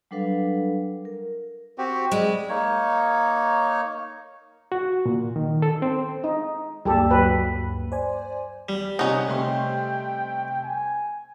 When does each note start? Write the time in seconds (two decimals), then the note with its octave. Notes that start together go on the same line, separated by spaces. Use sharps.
0.11 F#3 G3 D4 A4 B4 F5
1.05 A#4
1.78 C4 F#4 G4
2.11 G3 G#3
2.49 A#3 D#4 C#5
4.72 F#4
5.06 A#2
5.36 D#3
5.62 A4
5.82 C4
6.24 D#4
6.85 D2 G2 G3 A#3 G4 A4
7.10 F#3 B4
7.92 C5 D5 G#5
8.69 G3
8.99 C3 C#4 D#4 F#5 G5
9.28 C3 A3 C6
10.64 G#5